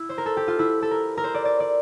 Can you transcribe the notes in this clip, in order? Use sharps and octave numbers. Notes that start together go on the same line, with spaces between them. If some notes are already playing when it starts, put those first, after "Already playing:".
Already playing: E4
C5
A#4
A4
G4
F4
E4
A4
A#4
A#4
C5
D5
D5
D5